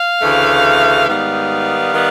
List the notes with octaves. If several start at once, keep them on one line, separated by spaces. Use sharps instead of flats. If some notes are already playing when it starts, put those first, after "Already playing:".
Already playing: F5
D2 C#3 E3 A3
G#2 D#3 G3 B3 F5
D#3 G3 B3